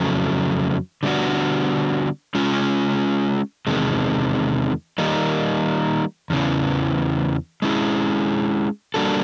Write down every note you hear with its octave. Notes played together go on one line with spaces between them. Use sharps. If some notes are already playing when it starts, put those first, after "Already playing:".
Already playing: F2 C#3 F#3 A3
D3 G3 B3 D4 F#4
G#3 C#4 F4
E2 C3 D#3 G#3
D#3 G3 A#3 D#4
E2 C#3 E3
G#3 C#4 E4 G#4
G3 A#3 D4 F#4 A4